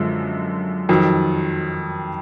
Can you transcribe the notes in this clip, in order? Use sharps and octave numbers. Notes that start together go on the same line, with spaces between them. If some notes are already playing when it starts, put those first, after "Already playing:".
Already playing: F#2 D3 F3 G#3
F2 D#3 F#3